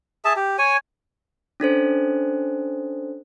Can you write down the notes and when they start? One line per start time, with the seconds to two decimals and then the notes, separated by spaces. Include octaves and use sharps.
0.25 G#4 E5 A5
0.36 G4
0.58 C#5 G#5
1.60 C#4 D4 A4 C5